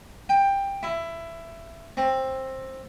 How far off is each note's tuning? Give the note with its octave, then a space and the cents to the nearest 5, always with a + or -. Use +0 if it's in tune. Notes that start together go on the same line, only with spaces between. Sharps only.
G5 +15
E4 +15
C4 +15